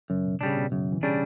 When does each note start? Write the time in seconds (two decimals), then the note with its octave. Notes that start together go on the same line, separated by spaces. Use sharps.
0.10 F#2 C#3
0.25 B2
0.41 A2 C#3 G3 D4
0.57 B2
0.72 F#2 C#3
0.92 E3
1.03 C#3 G3 D4